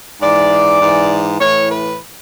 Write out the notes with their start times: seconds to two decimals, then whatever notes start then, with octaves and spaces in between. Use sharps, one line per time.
0.22 G#2 E3 D5
0.81 G#2 E3
1.40 A2 E3 C#5
1.70 B4